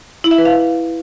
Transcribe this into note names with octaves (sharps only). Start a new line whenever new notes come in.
E4
E5
B4
F5